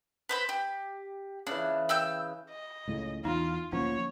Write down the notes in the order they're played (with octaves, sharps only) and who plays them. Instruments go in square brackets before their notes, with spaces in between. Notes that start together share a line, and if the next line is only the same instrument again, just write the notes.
[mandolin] B4 C5 B5
G4
[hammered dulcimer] C#3 E3 [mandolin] D4
[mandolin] G5 E6 G6
[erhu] D#5
[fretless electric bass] C#2 A2 C#3
[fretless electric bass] E2 [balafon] D#4 [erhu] F4
[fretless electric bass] D2 A#2 F3 [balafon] A#3 C#4 [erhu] C#5